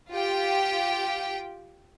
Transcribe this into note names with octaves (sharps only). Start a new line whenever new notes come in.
F4 G4 G5